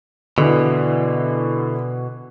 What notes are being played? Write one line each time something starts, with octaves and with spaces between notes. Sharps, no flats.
B2 D3 E3